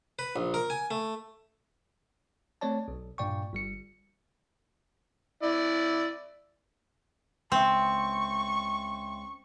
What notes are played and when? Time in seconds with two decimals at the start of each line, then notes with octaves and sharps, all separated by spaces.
0.19 B4
0.36 A#1
0.54 A#4
0.70 G#5
0.91 A3
2.61 A3 C4 C#5 D5 A5
2.88 B1
3.18 G2 A#2 D5 G5 C#6
3.53 G1 G3 C#7
5.43 E4 D5
7.52 C#2 C4 E5 G5 C6 C#6